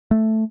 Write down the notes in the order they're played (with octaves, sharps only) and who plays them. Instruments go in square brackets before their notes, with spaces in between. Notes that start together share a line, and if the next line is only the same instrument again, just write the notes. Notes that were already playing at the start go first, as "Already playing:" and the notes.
[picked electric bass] A3